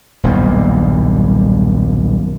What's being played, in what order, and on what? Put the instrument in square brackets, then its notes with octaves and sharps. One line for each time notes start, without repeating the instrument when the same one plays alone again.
[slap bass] D#1 B1 G2 A#3